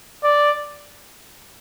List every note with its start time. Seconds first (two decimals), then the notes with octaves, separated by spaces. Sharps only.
0.24 D5